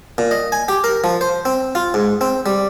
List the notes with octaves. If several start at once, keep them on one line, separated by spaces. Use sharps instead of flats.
A#2
D#5
G#5
G4
A#4
F3
C5
C4
F4
G#2
C4
G3